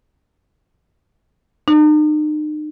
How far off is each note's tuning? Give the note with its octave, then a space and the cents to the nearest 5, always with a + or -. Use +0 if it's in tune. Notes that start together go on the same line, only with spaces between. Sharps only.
D#4 -40